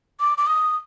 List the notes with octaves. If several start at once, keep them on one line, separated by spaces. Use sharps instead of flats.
D6
D6
D#6